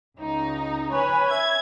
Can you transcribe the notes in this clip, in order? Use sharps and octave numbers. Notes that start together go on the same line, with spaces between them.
C#2 D#4
B4 C#5 G#5
E5 G#6